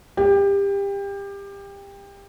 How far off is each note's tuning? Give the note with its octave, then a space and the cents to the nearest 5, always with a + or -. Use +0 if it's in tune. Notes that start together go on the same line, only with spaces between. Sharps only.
G4 +25